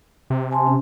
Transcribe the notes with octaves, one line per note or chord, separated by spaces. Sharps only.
C3
G#5 A5 C6
C#4